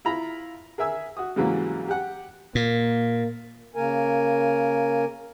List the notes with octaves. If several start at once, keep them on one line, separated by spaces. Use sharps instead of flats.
E4 F4 A#5 B5
G#4 A#4 E5 G#5 E6
F#4 D#6
G#2 C#3 E3 F#3 G3 A#3
G4 F#5
A#2 A#3
C#3 A#3 A#4 G#5